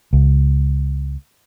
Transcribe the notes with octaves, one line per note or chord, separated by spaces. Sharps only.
C#2